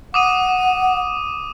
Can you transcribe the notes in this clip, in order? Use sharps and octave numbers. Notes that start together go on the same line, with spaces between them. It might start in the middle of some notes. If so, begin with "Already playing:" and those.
F#5 D6 D#6 D#7